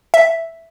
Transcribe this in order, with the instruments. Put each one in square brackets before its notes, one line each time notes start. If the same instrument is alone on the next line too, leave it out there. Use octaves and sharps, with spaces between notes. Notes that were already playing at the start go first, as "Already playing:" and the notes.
[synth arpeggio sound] E5